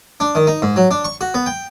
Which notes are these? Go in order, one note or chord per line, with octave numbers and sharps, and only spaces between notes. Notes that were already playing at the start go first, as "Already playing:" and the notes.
D4
D#3
D#4
G#2
F#3
D4
C#6
F#4
B3
G5